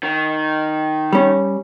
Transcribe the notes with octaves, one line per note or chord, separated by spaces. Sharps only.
D#3
G3 C#4